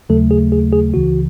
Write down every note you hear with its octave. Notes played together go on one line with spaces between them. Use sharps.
D#2 C#3 F#3 A3 A4
G#4
G#4
G#4
C#2 C#3 E3 F#4